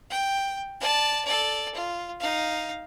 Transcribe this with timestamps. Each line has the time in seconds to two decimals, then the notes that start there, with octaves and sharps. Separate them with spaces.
0.10 G5
0.80 D5 A5
1.25 A4 D5
1.75 F4
2.20 D#4 F5